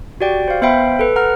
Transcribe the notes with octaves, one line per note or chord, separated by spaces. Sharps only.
F#4 G4 D5 G5
C5 F5
B3 C5 E5 F5 G5 B5
A4 B4
F#5 A#5 F6